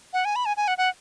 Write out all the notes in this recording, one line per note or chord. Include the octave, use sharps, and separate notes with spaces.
F#5
G#5
B5
G#5
G#5
F#5
F#5